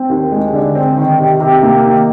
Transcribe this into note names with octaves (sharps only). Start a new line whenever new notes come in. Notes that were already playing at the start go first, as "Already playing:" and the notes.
Already playing: C4
D#2
G#3
D3
C4
D#3
C3
C3
A#3
D#3